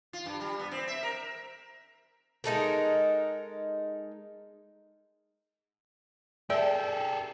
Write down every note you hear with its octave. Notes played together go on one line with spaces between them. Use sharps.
F4
G2
G3
B3
C4
E5
A#4
G#3 D#4 A4 A#4
G#4 A4 D5 E5 G5